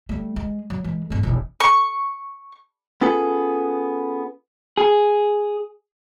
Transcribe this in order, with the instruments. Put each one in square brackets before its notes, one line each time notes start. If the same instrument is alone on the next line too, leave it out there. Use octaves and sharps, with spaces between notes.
[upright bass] G3 A3
G#3
F#3
E3 G#3
G#1 A3
E1 E4
[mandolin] C#6
[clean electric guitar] B3 C#4 F4 G#4 A4 B4
G#4